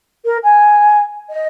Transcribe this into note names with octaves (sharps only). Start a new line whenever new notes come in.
A#4
G#5
D#5